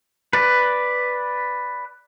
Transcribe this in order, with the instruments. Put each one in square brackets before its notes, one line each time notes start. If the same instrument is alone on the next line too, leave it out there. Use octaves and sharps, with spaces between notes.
[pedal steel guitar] B4 D5